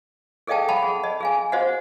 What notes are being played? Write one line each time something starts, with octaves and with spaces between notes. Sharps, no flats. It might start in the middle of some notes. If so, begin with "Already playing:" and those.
G#4 A4 D#5 F5 G5 A5
F5 F#5 A5 B5
G#4
D#5
G#4 F5 G#5
F#4 C5 D#5 F5 F#5